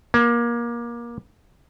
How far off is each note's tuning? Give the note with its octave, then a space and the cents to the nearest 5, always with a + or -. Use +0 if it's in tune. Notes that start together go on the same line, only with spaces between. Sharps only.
A#3 +25